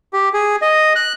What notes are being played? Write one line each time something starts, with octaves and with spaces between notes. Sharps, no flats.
G4
G#4
D#5
F#6